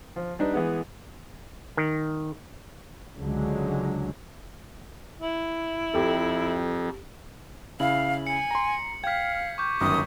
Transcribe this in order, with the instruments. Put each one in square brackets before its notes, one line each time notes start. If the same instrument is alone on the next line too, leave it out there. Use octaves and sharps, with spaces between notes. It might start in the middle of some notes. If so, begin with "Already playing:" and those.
[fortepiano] F3
G3 D4 D#4 B4
E3 G#3 B3
[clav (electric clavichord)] D#3
[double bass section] C#2 D3 F#3 G#3
[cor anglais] E4
[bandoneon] F2 [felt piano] G4 A4
[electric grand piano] C#3 E4 E5 [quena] F5 [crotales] F#7
[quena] G#5 [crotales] C#7
[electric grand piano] A#5 C6
[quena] F5 [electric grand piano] G5 F6 [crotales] G#6 B6
[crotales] C#6 D6 G6
[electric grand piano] G1 F#2 D#3 [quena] D#6